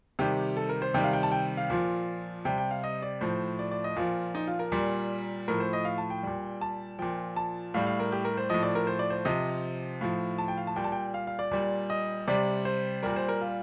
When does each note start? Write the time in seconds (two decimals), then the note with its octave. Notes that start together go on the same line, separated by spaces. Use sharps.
0.19 C3 D#3 G3 G4
0.57 A4
0.69 A#4
0.82 C5
0.94 C3 D#3 G3 G5
1.04 F5
1.13 G5
1.23 A5
1.32 G5
1.57 F5
1.70 A#2 F3
2.45 C3 G3 G5
2.58 G5
2.71 F5
2.84 D#5
3.02 D5
3.21 A2 F3 C5
3.59 D5
3.71 D5
3.84 D#5
3.96 A#2 F3 F4
4.35 D#4
4.47 F4
4.59 A#4
4.72 A#2 G3
5.48 A2 F3 A#4
5.60 C5
5.73 D#5
5.85 F5
5.98 A5
6.10 G5
6.23 A#2 G3
6.61 A5
6.99 A#2 F3 G5
7.36 A5
7.74 A2 G3 F5
7.86 F5
8.00 A#4
8.12 G4
8.25 A#4
8.38 C5
8.50 A2 F3 D#5
8.63 D5
8.75 A#4
8.87 C5
8.99 D5
9.10 C5
9.25 C3 F3 D#5
10.01 A2 F3 F5
10.38 A5
10.48 G5
10.57 F5
10.67 A5
10.76 A#2 G3 G5
10.84 A5
10.92 G5
11.14 F5
11.27 F5
11.39 D5
11.51 A#2 G3
11.90 D#5
12.28 C3 G3 D5
12.65 C5
13.03 A#2 G3 A#4
13.16 C5
13.29 A#4
13.41 F4